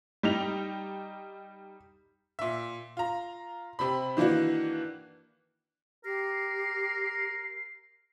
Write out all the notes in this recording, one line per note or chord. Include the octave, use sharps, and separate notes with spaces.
G3 D#4 F7
A#2 E5
F4 A#5
C3 C4 B5
D#3 E3 A#3 D4 F#4
G4 A#4 C7